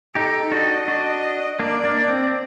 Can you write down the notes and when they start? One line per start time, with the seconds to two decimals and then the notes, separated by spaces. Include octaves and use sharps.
0.15 D#4 G4 A4
0.52 D4 F#4 D#5
0.88 D4 F#4
1.59 A#3 D4 D5
1.84 A#3 D4
2.08 C4